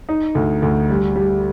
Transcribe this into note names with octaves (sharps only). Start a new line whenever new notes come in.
D#4
D2
D2
G3
G3